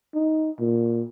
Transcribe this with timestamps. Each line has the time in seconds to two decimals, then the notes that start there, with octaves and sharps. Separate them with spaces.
0.14 D#4
0.59 A#2